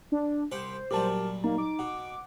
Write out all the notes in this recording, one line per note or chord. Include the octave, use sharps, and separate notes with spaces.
D4
C2 G4 C5 F#5
A#2 F#3 G3 G4 A#4 A5
A#3 D#4
D6
B2 F#5